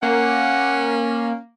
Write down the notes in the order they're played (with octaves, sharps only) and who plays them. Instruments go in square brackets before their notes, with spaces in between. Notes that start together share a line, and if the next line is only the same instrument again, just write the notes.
[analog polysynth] A#3 [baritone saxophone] C#4 [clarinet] F#5